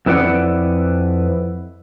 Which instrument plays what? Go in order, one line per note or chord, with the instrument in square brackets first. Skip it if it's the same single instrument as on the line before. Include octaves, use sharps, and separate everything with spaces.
[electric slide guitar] F2 E4 B4 D5 F#5